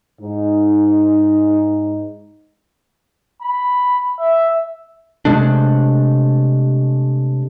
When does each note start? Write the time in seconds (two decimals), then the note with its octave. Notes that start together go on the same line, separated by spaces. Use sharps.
0.21 G#2 D#4
3.42 B5
4.19 E5
5.25 C3 G#3 A3 D4